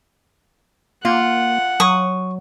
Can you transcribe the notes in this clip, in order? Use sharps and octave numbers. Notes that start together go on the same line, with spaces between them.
A#3 F4 F#5
F#3 C#6 D#6